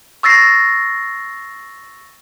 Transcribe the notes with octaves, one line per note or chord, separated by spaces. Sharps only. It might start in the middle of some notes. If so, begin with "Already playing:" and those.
C#6 E6 A6 A#6 C7